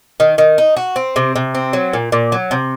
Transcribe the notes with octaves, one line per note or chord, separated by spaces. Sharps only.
D#3
D#3
D#4
F#4
C4
C3
C3
C4
F#3
A#2
A#2
F#3
C3